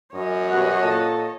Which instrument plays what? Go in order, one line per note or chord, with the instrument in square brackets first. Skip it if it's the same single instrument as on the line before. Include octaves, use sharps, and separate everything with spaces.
[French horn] F#2 [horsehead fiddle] C#5 D#5
[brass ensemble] B2 G3 [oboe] F#5
[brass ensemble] A#2 A4 A5